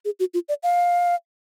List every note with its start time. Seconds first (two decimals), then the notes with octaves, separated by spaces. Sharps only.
0.05 G#4
0.20 F#4
0.34 F4
0.49 D5
0.63 F5